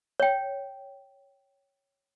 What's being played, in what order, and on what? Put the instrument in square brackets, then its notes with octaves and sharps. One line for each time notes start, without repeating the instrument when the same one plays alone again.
[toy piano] C#5 G5